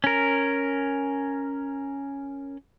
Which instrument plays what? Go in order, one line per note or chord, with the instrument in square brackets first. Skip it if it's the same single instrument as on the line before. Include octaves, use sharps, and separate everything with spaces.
[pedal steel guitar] C#4 A#4